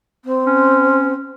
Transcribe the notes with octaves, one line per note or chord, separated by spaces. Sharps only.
C4
C#4